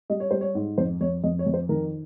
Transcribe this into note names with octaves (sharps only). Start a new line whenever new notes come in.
G3 D#5
C#5
G3 C5
C#5
G#2
F2 C5
F2 C#5
F2 D#5
C#5
F2
C5
D#3 A#4